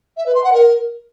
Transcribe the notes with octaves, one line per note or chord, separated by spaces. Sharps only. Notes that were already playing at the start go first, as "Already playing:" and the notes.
E5
B4
C6
F#5
A#4